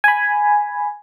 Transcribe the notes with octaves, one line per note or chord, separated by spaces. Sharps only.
G#5 B5